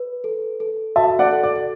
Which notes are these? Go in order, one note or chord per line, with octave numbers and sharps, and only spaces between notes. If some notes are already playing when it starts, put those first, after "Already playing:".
Already playing: B4
A4
A4
F#4 E5 A5
D5 F#5
A4
D5